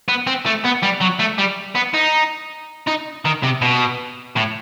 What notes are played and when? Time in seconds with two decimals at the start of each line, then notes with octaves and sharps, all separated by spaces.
0.08 B3
0.27 C4
0.46 A3
0.65 B3
0.83 G3
1.01 F#3
1.20 A3
1.39 G3
1.75 B3
1.94 D#4
2.88 D#4
3.25 D#3
3.43 C3
3.62 B2
4.36 A2